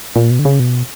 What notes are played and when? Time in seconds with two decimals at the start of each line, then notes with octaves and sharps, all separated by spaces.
0.16 A#2
0.31 B2
0.39 D3
0.45 C#3
0.60 B2